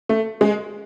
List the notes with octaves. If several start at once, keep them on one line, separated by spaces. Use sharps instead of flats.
A3
G#3